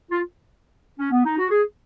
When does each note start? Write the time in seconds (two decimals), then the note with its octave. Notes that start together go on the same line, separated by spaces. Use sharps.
0.11 F4
0.99 C#4
1.12 B3
1.25 D#4
1.38 F#4
1.51 G#4